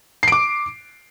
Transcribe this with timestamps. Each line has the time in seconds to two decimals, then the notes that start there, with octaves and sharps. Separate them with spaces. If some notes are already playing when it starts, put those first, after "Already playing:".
0.23 C7
0.28 D7
0.32 D6